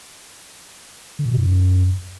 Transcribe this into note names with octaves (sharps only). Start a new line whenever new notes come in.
D3
A#2
B2
F#2